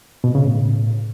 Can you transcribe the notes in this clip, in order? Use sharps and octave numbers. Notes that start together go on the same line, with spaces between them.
B2
C#3
A2